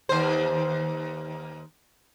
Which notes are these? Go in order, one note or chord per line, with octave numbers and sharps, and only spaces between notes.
D#2 C5